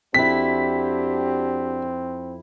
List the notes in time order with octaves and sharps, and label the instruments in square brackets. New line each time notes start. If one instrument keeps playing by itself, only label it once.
[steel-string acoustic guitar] F2 E4 [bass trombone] C4 [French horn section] D4 F#4 G4 [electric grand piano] B6